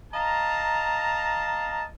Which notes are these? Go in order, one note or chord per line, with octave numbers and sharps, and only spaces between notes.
D#5 F5 A5 A#5